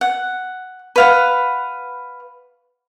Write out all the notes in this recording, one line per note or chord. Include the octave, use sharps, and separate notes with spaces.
F#5
B4 F5 F#5